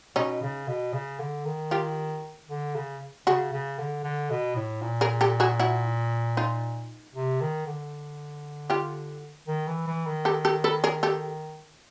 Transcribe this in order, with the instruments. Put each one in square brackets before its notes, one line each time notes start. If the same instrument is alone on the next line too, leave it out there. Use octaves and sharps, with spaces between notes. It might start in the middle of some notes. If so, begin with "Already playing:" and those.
[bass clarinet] B2 [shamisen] C#4 D#4
[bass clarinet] C#3
B2
C#3
D3
D#3
[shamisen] F4 G4
[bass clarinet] D3
C#3
[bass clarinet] C#3 [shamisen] F#4 G#4
[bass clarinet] C#3
D3
D3
B2
A2
A#2
[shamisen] G#4 A#4
G4 A4
F#4 G#4
E4 F#4
D#4 F4
[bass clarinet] C3
D#3
D3
[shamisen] F4 G4
[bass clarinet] D#3
E3
E3
D#3
[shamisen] G4 A4
G4 A4
A4 B4
G#4 A#4
G4 A4